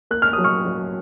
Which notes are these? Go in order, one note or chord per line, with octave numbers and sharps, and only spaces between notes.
A#3 F#6
F6
D#6
F#3
C#6 F6
F#3